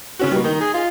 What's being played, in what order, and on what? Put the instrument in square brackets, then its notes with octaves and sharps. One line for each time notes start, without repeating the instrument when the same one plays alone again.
[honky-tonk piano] C#3 C#4 F#4
[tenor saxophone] B2 [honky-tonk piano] G3 A#3
[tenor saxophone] D#3 [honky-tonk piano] D#4
[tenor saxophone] G#4
F4